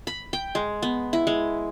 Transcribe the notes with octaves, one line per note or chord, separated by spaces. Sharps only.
B5
G5
G#3
B3
E4
G#3